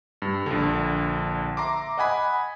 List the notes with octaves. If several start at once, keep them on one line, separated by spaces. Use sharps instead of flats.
G2
A#1 D3
E5 A#5 C6 D6
D#5 F#5 G#5 B5